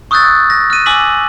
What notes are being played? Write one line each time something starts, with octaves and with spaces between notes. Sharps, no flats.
C#6 D#6 E6 F#6 G6 A6
A#6
F6 F#6 D#7
G#5 D6 E6 B6 F#7